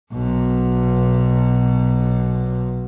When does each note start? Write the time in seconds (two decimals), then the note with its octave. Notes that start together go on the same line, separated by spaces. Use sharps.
0.13 B1 B2